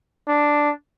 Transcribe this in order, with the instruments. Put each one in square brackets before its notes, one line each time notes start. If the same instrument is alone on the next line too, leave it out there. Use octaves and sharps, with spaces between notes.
[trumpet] D4